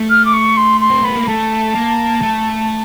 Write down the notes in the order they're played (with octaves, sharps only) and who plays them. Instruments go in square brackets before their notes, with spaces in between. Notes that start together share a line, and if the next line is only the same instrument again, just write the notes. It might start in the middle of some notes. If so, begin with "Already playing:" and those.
Already playing: [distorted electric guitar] A3
[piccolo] F6
D6
C#6
C6
C6
[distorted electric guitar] C4
[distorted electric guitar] B3 [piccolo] B5
[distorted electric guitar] A#3
[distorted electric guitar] A3 [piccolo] A5
[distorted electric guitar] A#3
A3